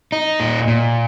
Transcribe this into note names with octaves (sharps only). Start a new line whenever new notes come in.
D#4
A#2
A#2